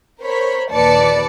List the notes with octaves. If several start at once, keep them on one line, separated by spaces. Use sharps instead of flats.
A#4 C5 C#5 B5
A#1 D#2 B4 D5 A5 C#7